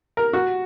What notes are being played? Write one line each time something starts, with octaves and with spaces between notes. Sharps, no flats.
A#4
F#4